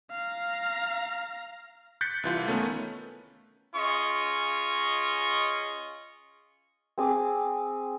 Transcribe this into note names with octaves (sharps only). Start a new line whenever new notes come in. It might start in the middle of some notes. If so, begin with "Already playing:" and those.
F5 A#5
F#6 G6 A6 B6 C#7
C2 E3 F4
D#3 A3 B3 C#4
C#4 F4 G#4 D#5 C#6
C4 G#4 D6